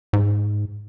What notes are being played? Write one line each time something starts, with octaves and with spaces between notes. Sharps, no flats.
G#2